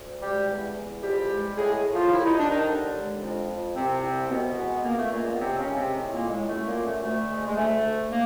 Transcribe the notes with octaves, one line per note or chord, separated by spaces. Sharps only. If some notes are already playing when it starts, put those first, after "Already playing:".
Already playing: D2
G3 G#3 G4
E2
E2
F2 G3 G4
G#3
A2 G#3 G#4
A2
F3 F4
C2 E4
D#4
C2 D4
D#3 D#4
D#2 D3 D4
G#3
F2
F2
C2 C3 C4
C2
C2 B2 B3
G#3
C#2 A#3
A3
A#2 G#3 A#3
B3
D#2 C3 C4
C#3 C#4
G#3
C3 C4
A2
A#2 A#3
A2
G#3
F#2 A3
A#2 A#3
F#2
A3
D2 A3
G#3
G#3
D2 A3
D2
A#3